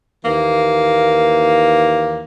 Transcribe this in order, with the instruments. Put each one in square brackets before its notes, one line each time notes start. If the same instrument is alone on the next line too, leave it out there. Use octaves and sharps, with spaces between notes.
[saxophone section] D#2 E3 A#3